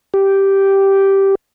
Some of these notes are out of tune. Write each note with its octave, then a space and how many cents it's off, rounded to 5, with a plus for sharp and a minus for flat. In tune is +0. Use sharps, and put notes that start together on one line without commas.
G4 -5